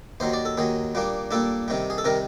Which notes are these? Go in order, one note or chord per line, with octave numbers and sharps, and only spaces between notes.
D#2 D#3 F#3 C5
D5
A4
D#2 D#3 F#3 G#4
A#2 G3 A#3 D4
A#2 G3 A#3 D4 A4
C3 D#3 G3
G#4
A4
C3 D#3 G3 A#4